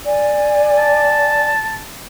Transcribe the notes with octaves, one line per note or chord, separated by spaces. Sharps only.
D5 G#5
A5